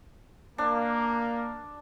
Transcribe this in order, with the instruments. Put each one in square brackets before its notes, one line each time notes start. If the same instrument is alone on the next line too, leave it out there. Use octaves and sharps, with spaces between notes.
[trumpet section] A#3 [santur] D4